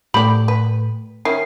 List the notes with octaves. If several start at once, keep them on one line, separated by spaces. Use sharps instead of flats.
A2 A3 G4 D5 B5
B4
D#3 C#4 E4 C7